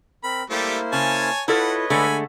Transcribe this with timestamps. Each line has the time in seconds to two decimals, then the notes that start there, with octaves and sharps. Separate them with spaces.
0.24 C4 A#4 B5
0.50 G3 A3 A#3 E4 G4 C5
0.93 C#3 C#5 G#5 A5
1.48 E4 F4 A4 B4 C#5 D#5 F#5
1.90 D3 G#3 A3 G#5 B5